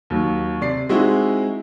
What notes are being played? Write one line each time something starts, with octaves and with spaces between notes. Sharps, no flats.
D#2 F#3
C3 D5 C7
G#3 C4 D#4 E4 F#4